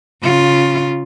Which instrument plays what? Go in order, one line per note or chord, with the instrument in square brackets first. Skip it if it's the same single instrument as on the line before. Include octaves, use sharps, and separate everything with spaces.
[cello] C#3 F4